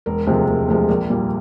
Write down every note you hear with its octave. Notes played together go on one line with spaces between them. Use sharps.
E1 A#4
D2 C3 F3 G#3
E1
D2 C3 F3 G#3
A#1 A#4
A#2 G3 A#3